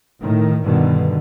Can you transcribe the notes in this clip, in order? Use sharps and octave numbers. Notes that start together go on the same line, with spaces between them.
A2 D#3
G2 B2 D3 D#3